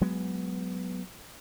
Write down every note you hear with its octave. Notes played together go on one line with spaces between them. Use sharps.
F#3 G#3 B3